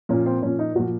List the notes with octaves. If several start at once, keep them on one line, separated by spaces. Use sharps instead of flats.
A#2 F3 C#4
C4
A#2 F3 C#4
D#4
A#2 F3 F#4